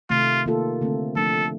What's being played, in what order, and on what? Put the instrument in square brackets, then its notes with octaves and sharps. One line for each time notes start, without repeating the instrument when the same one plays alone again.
[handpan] C3 D#3 A3 [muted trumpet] F4
[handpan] D#3 A#3 F4 A4
D3 A3 C4
[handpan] F3 A3 D4 [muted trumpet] A4